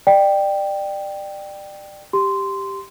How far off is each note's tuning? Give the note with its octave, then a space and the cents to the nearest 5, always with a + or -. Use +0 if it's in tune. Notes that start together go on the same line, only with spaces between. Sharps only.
D5 +25 G5 +0
G4 +0 C6 -10